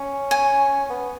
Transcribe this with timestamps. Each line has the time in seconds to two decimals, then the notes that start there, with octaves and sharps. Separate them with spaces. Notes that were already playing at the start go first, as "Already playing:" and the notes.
Already playing: C#4
0.31 G#5
0.89 B3